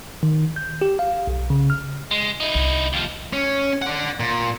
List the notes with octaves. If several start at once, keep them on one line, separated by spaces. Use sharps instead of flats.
D#3
G6
G4
F5
B1
C#3
F6
G#3
D#4 E4
C2
D#2 F3
C#4
D4 F#5
A#2